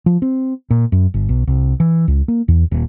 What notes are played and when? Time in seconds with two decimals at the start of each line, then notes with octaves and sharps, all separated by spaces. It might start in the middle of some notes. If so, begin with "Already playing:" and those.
0.06 F3
0.22 C4
0.71 A#2
0.92 F#2
1.14 G1
1.29 B1
1.47 C2
1.80 E3
2.08 C#2
2.28 A#3
2.48 E2
2.72 D#1